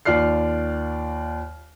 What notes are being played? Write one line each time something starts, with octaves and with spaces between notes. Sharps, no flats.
D#2 F4 D5 F6 C7